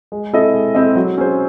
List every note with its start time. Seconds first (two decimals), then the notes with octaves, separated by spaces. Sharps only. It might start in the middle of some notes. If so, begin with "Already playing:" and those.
0.12 G#3
0.33 C4 E4 A4 D#5
0.54 G#3
0.75 C4 E4 A4 D#5
0.96 F#3
1.18 C#4 G#4 C5